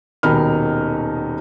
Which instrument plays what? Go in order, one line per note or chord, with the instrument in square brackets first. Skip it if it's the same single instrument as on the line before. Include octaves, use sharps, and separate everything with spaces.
[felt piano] D#1 B2 D#3 D#4 B5 F6